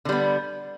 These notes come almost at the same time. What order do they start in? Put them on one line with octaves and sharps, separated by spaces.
D3 G3 B3